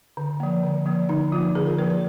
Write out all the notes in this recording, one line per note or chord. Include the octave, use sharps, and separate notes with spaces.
D3
F3 A#3
D3
F3 A#3
D3 D#4
F3 A#3 F4
D3 G#4
A#4
F3 A#3 B4
B4